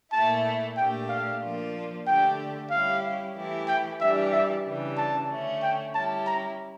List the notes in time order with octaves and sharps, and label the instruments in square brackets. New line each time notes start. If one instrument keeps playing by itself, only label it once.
[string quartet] A#2 A3 E4 [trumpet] A5
[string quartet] A#2 A3 D4 G4 [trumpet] G5
[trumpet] F5
[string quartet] F3 A#3 D4 F4
[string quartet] D3 A3 D4 G4 [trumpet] G5
[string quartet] G3 C#4 E4 G4 [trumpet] F5
[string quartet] E3 A3 E4 G4
[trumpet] G5
[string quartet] E3 G3 D4 G4 [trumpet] E5
[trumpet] E5
[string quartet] C#3 E3 G3 D4
[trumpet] A5
[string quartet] D3 A3 C#4
[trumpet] G5
[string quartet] G3 C#4 E4 G4 [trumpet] A5
[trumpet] A#5